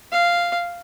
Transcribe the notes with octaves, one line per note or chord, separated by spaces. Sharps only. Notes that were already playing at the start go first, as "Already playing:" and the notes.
F5